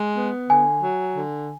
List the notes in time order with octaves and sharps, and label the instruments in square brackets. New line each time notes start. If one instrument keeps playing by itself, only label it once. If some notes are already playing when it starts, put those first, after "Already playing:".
Already playing: [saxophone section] G#3
B3
[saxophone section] D3 [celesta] G#5
[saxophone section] F#3
D3